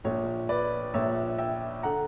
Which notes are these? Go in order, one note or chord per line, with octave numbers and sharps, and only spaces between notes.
A#1 A#2 C#5
B4 D5
A#1 A#2 C#5 E5
E5 G5
D3 F#5 A#5